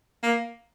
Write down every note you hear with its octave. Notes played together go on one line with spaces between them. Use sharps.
A#3